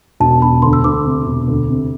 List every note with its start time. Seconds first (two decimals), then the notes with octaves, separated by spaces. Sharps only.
0.20 E1 A5
0.42 E1 B5
0.62 D2 C6
0.73 E6
0.84 D2 D6
1.05 C3
1.26 E1
1.48 D2
1.68 C3